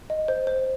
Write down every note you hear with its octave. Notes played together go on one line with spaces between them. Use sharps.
D#5
C5
C5